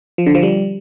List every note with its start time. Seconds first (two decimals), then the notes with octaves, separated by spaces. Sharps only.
0.18 F3
0.26 D3
0.35 F3
0.43 G3